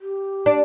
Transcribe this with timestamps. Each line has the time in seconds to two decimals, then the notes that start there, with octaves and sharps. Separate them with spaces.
0.01 G4
0.46 D4